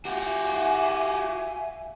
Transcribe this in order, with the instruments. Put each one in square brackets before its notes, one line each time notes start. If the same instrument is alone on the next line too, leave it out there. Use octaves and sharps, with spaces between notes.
[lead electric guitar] F#4 G4 [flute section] E5 F5 G#5